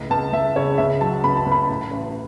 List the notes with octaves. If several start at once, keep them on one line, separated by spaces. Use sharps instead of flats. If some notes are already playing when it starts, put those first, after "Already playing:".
Already playing: C#2 A2
C#2 A5
C#2 E5
C#3 C#5
C#2 E5
F#3 A5
C#2 B5
A5
C#2
B5
A2
A1